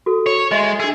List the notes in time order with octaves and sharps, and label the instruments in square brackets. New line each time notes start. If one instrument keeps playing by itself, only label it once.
[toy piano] F#4 A4
[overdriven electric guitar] C#5
[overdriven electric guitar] G#3 [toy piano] D#5 E5 C6
[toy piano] D4 E6 [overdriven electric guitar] G#4